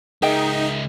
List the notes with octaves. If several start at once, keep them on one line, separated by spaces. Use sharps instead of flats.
C#2 D#4 G#4 A#4 D#5 E5 G5